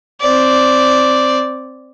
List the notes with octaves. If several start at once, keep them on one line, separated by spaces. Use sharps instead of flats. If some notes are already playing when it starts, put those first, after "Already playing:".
C4 D5